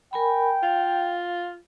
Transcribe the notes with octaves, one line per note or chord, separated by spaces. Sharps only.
A#4 G5 G#5 B5
F4 F5